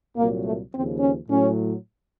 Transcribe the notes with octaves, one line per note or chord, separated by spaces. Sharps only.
C2 A#2 F#3 A#3
A3
D#2 C#3 F3 C4
C#4
A2 F#3 C#4